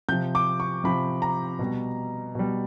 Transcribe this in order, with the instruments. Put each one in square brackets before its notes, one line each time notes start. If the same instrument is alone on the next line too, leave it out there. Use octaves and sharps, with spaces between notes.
[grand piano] C3 G6
F3
D6
C#6
C3 F3 B5
A#5
B2 G3
B2 G3